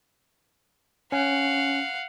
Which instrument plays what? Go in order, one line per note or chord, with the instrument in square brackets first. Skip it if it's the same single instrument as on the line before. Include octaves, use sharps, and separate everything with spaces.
[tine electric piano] C#4 [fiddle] F5 F#5